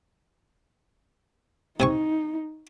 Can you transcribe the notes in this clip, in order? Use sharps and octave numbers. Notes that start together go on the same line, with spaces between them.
C3 D#4 G#5 C#6